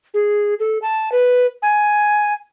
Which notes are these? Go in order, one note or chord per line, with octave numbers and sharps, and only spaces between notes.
G#4
A4
A5
B4
G#5